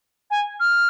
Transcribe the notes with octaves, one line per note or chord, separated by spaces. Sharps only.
G#5
F6